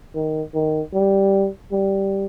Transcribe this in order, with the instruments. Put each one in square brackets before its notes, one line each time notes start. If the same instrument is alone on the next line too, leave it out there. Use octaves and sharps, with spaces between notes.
[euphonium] D#3
D#3
G3
G3